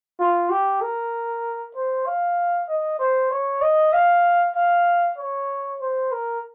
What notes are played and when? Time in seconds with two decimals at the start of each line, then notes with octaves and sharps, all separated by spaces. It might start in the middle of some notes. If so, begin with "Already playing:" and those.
0.19 F4
0.50 G4
0.81 A#4
1.76 C5
2.06 F5
2.68 D#5
2.99 C5
3.31 C#5
3.61 D#5
3.93 F5
4.56 F5
5.18 C#5
5.81 C5
6.11 A#4